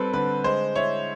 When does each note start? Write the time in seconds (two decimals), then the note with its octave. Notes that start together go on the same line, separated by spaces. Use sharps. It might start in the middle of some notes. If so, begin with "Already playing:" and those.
Already playing: G3 C4 A4 B4
0.13 D3 B4
0.44 G#3 C5
0.76 E4 C#5